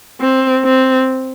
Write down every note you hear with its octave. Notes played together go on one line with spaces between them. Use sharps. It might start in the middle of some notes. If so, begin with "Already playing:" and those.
C4
C4